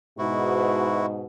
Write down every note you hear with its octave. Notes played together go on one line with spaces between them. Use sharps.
G#2 B2 E4 F#4